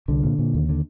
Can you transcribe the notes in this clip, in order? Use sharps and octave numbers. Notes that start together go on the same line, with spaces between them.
C2 D3
A#2
A#2
D#2
D3